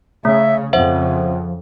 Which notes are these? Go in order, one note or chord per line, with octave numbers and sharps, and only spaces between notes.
C#3 A3 E5
F2 C#3 F3 C5 E5 F#5